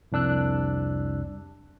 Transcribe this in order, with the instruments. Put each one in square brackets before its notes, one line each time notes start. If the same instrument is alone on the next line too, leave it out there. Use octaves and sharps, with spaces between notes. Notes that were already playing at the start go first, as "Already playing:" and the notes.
[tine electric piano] C2 F2 D4 E6 F#6